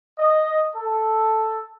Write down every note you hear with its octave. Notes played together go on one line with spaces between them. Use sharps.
D#5
A4